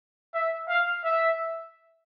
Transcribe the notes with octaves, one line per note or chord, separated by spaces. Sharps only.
E5
F5
E5